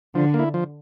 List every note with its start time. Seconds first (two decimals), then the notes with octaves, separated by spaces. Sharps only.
0.15 D3 F3
0.34 A#3 E4
0.54 F3